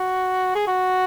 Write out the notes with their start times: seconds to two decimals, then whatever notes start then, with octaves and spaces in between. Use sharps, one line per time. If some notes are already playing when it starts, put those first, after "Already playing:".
Already playing: F#4
0.55 G#4
0.67 F#4